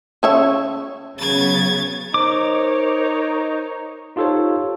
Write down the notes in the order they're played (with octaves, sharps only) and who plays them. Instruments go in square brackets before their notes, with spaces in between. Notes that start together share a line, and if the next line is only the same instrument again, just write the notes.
[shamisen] C#3 C#5 E5
[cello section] C#3 F#3 B3 [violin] G#6 A6
[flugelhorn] D#4 [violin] A#4 C#5 [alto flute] C5 [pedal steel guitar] D6
[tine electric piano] D#4 F4 G4 A4 C5 C#5